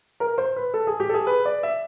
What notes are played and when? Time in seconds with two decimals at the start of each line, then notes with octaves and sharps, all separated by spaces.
0.20 A#4
0.38 C5
0.56 B4
0.74 A4
0.87 G#4
1.00 G4
1.09 A4
1.14 G#4
1.27 B4
1.45 D5
1.63 E5